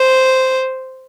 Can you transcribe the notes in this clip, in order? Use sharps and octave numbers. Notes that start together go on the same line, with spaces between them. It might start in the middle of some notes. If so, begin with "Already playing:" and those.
Already playing: C5